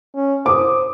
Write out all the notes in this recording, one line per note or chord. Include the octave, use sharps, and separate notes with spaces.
C#4
C5 D6 D#6